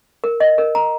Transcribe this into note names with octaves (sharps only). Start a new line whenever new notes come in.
A#4
D#5
A#4
A#5